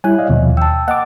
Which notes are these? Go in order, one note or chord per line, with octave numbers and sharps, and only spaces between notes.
G3 E4 C#5 E5 G#5 F#6
D5 D#5 F5
D#2 B2 F3
G5 A5 E6
A#3 D#5 F#5 D6